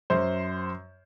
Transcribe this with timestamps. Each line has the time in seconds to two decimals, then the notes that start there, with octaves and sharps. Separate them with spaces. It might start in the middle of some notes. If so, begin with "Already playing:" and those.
0.10 F#2 C5